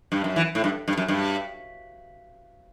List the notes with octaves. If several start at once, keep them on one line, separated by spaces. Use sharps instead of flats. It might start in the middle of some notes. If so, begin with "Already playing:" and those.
G2
F#2
E3
A2
G2
G2
F#2
G2